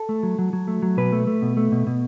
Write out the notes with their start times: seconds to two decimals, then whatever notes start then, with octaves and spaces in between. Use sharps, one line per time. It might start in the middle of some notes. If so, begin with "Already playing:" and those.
Already playing: A4
0.09 A3
0.23 F#3
0.39 F#3
0.53 F#3
0.68 A3
0.82 F#3
0.97 B2 B4
1.12 A3
1.27 A3
1.42 B2
1.57 A3
1.72 B2
1.87 B2